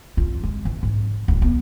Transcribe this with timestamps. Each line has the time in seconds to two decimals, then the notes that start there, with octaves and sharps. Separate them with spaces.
0.17 F4
0.43 G#3
0.65 E3
0.83 G#2
1.28 D1
1.42 B3